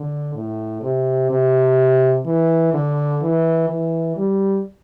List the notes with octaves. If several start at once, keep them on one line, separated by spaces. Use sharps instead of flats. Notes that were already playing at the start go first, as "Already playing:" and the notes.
Already playing: D3
A2
C3
C3
E3
D3
E3
E3
G3